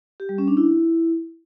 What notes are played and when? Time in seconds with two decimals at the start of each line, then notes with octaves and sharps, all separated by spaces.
0.20 G4
0.29 G3
0.38 C#4
0.48 D4
0.57 E4